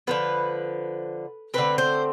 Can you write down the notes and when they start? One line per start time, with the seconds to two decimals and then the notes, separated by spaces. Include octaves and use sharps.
0.07 D3 F3 B3 B4
1.54 D3 A3 C4 B4
1.78 C5